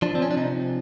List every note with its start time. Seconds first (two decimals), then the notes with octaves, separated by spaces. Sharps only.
0.02 F3 D4
0.15 C4
0.22 C#4
0.31 D4
0.37 C3 D#4